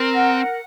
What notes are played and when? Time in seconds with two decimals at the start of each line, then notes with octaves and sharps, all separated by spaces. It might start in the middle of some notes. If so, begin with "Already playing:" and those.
Already playing: C4 A#4
0.13 F#5